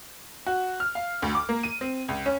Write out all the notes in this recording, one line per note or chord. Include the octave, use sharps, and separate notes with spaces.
F#4
F6
F5
D2
D6
A#3
D#7
C4
C#2
C#4